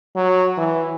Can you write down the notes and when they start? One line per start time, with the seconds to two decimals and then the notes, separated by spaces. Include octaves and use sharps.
0.16 F#3
0.57 E3